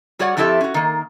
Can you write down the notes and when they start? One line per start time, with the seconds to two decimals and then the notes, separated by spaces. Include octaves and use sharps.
0.19 G3 F#4 G#4 C#5 D5 F#5
0.37 F2 F3 E4 G4 A4 E5
0.61 C#4 F#4
0.74 D#3 A#3